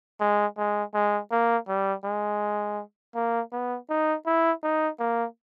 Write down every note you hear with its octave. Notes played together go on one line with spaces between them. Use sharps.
G#3
G#3
G#3
A#3
G3
G#3
A#3
B3
D#4
E4
D#4
A#3